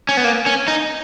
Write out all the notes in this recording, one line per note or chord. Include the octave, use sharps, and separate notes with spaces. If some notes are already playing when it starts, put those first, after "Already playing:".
C#4
B3
A#3
C#4
D#4